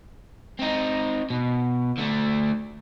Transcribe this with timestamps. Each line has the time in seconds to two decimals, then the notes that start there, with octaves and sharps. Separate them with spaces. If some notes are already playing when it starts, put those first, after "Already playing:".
0.59 C4 D#4
1.30 B2
1.98 D3 A3